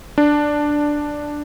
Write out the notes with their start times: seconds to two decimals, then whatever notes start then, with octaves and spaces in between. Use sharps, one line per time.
0.18 D4